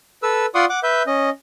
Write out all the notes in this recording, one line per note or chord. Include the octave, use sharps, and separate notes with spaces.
A4 B4 E6
F4 D5 F#5 C6 C#6 D#6
F#5 D6
B4 E5 G6
C#4 D#5